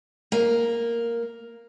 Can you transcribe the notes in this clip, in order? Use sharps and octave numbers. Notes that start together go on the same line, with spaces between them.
A#3